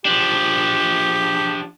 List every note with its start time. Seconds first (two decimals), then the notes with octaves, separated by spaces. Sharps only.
0.05 F3 D4 G4